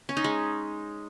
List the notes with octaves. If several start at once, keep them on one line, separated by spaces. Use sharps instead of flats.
C#4
D#4
G#3